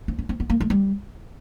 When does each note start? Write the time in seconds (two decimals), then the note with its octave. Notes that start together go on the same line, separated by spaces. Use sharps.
0.08 C4
0.19 C#4
0.29 C4
0.40 B3
0.50 A#3
0.60 A3
0.70 G3